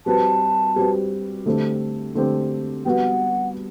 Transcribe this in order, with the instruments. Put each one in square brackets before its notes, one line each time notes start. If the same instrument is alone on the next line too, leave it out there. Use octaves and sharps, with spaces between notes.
[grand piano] G3 C4 F#4 B4 [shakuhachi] A5
[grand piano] G3 C4 F#4 B4
D3 A3 C4 G4
D3 A3 C4 G4
[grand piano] G3 B3 F#4 B4 [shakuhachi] F#5 G5